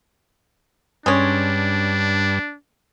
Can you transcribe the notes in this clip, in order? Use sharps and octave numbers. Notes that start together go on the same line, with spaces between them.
G2 G#3 C#4 D4